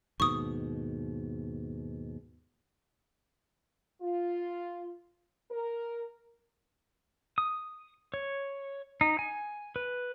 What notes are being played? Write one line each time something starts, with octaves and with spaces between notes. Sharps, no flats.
D#2 G#2 B2 C#6 D#6
F4
A#4
D#6
C#5
D#4
G#5
B4